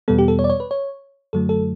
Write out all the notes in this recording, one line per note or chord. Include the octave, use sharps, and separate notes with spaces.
E2 B2 G3 B3 A4
G4
A4
C#5
D5
C#5
B4
C#5
F#2 D3 F#3 A3 A4
A4